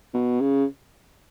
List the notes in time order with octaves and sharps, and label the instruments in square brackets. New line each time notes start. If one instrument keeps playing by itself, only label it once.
[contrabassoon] B2
C#3